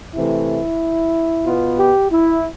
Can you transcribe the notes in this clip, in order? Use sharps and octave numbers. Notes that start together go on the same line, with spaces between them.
C3 E3 A3 E4
B2 B3 F4
G4
E4